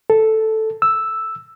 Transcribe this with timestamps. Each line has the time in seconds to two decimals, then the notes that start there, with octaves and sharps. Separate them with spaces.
0.10 A4
0.82 E6